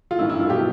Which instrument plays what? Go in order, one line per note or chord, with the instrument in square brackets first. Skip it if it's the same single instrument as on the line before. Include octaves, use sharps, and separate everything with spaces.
[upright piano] F4
A1 G2 D#3 E4
E4
F4
B2 F#3 G4